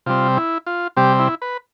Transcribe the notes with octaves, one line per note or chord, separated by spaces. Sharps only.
C3 G3 C4 F4
E4
F4
C3 G3 C4 G4
E4
B4